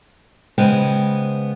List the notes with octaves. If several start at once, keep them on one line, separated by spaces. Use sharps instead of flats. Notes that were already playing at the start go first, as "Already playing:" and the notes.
C#3 G#3 B3 C5 G5 G#5